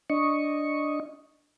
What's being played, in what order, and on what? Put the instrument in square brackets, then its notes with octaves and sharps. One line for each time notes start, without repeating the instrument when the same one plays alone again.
[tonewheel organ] D4 D#5 C#6